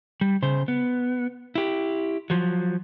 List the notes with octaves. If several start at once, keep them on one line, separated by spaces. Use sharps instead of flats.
G3
C#3 C5
B3
E4 G4
F3 F#3